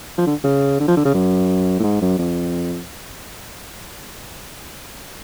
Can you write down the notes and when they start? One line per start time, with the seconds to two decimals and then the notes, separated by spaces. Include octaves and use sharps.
0.18 F3
0.27 D3
0.44 C#3
0.80 D3
0.88 F3
0.97 D3
1.05 C#3
1.14 F#2
1.80 A2
1.84 G#2
2.02 F#2
2.19 F2